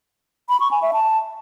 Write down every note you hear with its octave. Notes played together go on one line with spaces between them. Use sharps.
B5
C#6
G#5
E5
A5